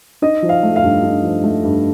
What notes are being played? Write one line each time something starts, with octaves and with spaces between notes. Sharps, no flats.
D#4 D#5
F3
F5
A3
F5
G2
D#4
F3
A3
G2